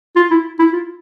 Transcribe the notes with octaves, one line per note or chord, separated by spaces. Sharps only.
F4
E4
E4
F4